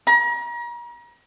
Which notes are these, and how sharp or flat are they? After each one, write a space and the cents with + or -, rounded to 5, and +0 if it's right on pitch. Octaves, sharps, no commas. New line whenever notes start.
A#5 +40